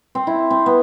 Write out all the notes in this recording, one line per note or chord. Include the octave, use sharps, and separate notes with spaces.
C4
E4
C4
B3